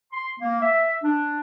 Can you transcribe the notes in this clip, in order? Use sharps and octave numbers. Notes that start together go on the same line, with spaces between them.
C6
A#3
E5
D4